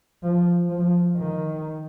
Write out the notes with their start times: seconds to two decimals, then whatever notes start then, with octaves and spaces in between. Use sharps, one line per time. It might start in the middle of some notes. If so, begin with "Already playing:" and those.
0.23 F3
0.70 F3
1.17 D#3